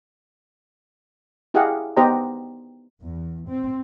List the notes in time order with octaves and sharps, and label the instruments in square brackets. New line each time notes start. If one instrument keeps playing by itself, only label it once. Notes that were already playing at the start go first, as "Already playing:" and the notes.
[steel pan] E4 G4 G#4 D#5 F5 F#5
B3 D#4 G4 C5 D#5 A#5
[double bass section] E2
C4